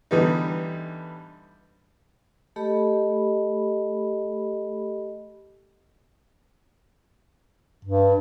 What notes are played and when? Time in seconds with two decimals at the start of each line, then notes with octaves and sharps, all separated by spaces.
0.11 D3 E3 G3 B3 D#4
2.56 A3 G4 A4 D#5 B5
7.85 G2